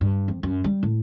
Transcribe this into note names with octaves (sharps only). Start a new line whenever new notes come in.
G2
F2
F#2
G3
A2